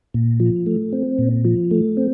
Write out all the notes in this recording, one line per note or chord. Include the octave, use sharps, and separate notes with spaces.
A#2
F3
A3
C4
A#2
F3
A3
C4